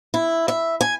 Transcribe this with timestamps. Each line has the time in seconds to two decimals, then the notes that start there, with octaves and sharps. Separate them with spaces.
0.14 E4
0.48 E5
0.81 G#5